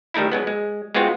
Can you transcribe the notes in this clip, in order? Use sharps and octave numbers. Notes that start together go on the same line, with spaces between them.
D#3 G3 A3 D#4 E4
F#3 G#3 B3
G#3
G#3 B3 C4 F4 F#4